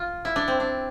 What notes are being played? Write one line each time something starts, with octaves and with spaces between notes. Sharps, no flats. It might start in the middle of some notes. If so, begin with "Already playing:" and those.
Already playing: F4
E4
D4
C4
D4